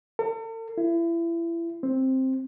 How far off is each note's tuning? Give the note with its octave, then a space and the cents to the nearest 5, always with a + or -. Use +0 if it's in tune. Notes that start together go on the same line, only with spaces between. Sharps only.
A4 +45
E4 +30
C4 +5